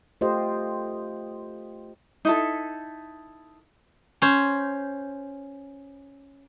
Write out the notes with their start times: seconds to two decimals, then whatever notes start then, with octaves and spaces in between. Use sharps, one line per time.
0.21 A3 F4 G4 C5 D#5
2.25 D#4 E4 A4
4.22 C#4 C5